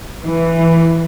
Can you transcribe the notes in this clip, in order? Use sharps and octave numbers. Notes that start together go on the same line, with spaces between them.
E3